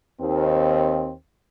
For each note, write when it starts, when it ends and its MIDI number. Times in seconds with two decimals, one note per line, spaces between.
0.20 1.11 39
0.20 1.11 60